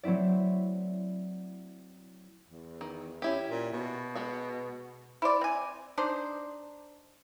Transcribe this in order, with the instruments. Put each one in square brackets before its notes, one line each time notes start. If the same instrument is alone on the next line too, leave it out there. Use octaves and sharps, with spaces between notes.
[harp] F#3 A3 C4 E4 D5
[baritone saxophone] E2
[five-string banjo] D#3
C#4 E4 G4
[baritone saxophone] A#2
B2
[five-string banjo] G#3 B3 F#4
[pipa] E4 C5 D5
C4 G#5
D4 D#4 C5